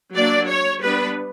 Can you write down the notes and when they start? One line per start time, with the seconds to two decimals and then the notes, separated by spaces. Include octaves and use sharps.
0.16 F#3 A#3 D4 D5
0.49 C#5
0.82 G3 B3 D4 B4